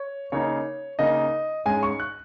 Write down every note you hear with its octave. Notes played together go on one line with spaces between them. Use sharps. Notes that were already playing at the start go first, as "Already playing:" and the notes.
Already playing: C#5
C#3 A#3 D#4 C#5
C#3 A#3 D#4 D#5
G#2 G#3 C#4 G#5
C#6
F#6